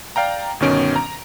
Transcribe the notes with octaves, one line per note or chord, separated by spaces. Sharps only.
D5 F5 G5 A#5
G1 B2 D#3 C#4 D7
A#5